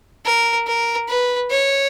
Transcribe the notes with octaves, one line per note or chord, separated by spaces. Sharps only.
A#4
A#4
B4
C#5